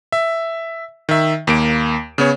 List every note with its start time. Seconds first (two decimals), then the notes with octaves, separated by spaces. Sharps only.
0.12 E5
1.09 D#3 E5
1.47 D#2 A#3 D7
2.18 C#3 B3 C#5